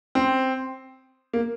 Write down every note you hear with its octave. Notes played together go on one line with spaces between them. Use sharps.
C4
A#3